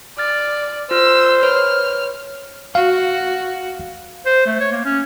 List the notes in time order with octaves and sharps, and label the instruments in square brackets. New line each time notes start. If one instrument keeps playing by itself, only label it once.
[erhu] D5 [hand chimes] F6 A6
[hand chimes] F4 F6 [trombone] C5 [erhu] E6
[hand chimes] B4 C#5 [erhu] F6
[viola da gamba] F#4 [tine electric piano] F5
[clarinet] C5
A3
C#5
A#3
C#4